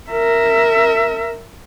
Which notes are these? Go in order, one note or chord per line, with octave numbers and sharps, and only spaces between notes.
A#4 E5